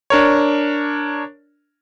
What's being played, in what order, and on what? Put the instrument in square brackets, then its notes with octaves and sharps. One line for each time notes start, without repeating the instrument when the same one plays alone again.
[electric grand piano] D4 A#4 C#5